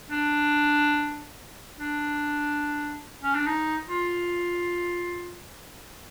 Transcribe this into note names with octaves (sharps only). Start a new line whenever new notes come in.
D4
D4
C#4
D4
D#4
F4